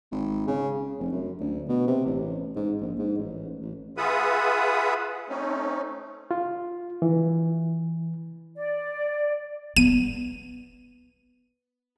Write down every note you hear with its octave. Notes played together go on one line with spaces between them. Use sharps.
G#1
C#3
F1
F#2
D2
B2
C3
A1
G#2
A#1
G#2
A1
A1
F4 G#4 B4 E5 F#5 D#6
A3 C4 C#4 D#4
F4
E3
D5
B3 D#7